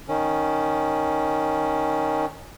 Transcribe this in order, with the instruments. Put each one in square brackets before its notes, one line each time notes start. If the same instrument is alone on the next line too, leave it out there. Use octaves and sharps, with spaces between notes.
[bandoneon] D#3 C#4